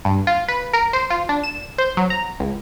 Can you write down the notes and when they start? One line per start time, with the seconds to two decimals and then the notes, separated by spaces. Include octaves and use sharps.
0.05 G2
0.27 F4
0.48 B4
0.73 A#4
0.93 C5
1.10 F4
1.29 D4
1.43 E7
1.78 C5
1.97 F#3
2.10 A#5
2.40 C#2